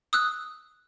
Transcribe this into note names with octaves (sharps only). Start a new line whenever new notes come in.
D#6 E6 F#6